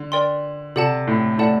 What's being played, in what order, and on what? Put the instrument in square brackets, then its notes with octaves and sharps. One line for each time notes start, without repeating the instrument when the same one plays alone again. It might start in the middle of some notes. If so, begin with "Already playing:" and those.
Already playing: [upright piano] D3
[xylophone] A#4 D5 G5 C6
[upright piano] C3 [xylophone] A4 D5 F#5 A5
[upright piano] A2
[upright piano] A2 [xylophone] A4 D5 F#5 A5